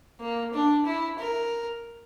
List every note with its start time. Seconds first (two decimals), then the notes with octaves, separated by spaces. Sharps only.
0.20 A#3
0.53 D4
0.86 E4
1.19 A#4